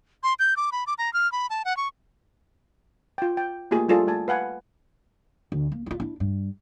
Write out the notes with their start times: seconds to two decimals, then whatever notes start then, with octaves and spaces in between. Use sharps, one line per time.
0.23 C6
0.39 G6
0.57 D6
0.72 B5
0.87 D6
0.98 A#5
1.13 F6
1.32 B5
1.50 A5
1.65 F#5
1.77 C#6
3.18 F4 G5
3.37 G5
3.71 A3 A#3 F4 G4 G#4
3.88 G3 E4 F4 G#4 A4 D5
4.07 A3 D5 G#5 A5
4.28 B4 F5 F#5 G#5
5.52 D2
5.72 A#3
5.86 E4 F4
6.00 D4 E4
6.20 G2